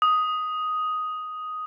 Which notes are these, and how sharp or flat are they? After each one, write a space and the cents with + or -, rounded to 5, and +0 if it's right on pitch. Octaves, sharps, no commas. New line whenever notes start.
D#6 +5